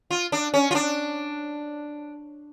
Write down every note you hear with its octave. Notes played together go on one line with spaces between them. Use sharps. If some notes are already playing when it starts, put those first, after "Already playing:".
F4
D4
C#4
F4
D4